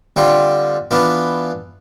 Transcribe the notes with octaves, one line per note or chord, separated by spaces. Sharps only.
D3 G3 C4 F4
E3 B3 D4 F4